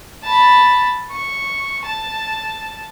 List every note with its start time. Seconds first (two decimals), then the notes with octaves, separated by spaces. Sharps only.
0.24 A5 B5
1.11 C#6
1.86 A5